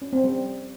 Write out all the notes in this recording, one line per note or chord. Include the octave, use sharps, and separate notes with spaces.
C#4
C4
G3